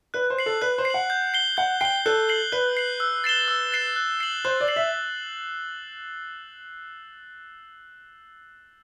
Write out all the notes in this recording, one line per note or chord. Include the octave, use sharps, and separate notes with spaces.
B4 F#6
C5
C7 F#7
A4
B4 F#6
C5
C7
F#5 F#7
G6
C7 G7
F#5 G6
G5 C7 G7
A4 F#6
C7 F#7
B4 F#6
C7 F#7
E6
A6 C7 E7 G7
E6
A6 C7 E7 G7
F#6
C7 F#7
C5 F#6
D5
C7 F#7
E5